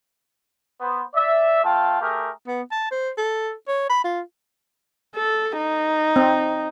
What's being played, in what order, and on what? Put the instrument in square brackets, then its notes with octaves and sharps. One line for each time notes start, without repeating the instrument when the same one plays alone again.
[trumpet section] B3 C5
D5 E5
A3 F4 F5 G5 A5
A3 G4 G#4 A#4
[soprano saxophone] B3
A5
C5
A4
C#5
B5
F4
[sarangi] A4
D#4
[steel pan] C4